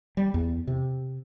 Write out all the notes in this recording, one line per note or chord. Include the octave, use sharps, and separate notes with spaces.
G3
E2
C3